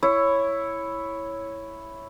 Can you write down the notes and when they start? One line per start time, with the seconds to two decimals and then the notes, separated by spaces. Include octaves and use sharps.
0.03 E4 C#5